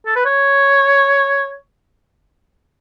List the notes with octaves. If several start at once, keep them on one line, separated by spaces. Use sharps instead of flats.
A4
B4
C#5